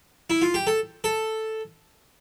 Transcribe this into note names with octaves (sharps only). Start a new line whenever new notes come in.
E4
F4
G4
A4
A4